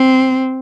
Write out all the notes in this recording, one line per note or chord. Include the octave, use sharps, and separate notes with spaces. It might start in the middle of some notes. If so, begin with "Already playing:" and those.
Already playing: C4